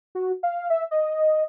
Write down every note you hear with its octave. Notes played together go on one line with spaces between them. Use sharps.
F#4
F5
E5
D#5